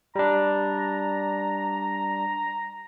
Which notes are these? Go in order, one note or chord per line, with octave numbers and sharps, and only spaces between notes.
G3 D4 A#5